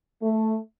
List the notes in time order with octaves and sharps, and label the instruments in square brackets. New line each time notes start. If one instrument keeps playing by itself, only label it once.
[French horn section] A3